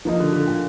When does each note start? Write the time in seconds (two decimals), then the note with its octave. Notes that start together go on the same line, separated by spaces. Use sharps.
0.05 F3 A#3 D#4
0.20 D3
0.33 D3
0.47 A#2